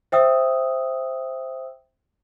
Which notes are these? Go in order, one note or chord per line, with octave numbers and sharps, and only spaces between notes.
C5 E5 G5 D#6 E6